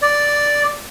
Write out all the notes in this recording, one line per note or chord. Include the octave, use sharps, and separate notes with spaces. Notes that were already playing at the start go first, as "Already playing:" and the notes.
D5